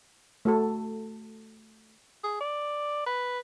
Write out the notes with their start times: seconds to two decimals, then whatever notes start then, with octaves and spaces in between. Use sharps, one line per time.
0.45 A3 F#4 A4
2.24 G#4
2.40 D5
3.06 B4